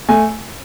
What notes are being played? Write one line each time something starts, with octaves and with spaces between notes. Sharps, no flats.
A3 G#5